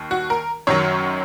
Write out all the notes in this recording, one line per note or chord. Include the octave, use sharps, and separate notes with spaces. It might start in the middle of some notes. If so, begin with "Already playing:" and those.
Already playing: D#2 D#3
F#4
A#4
F#2 D#3 F#3 C#5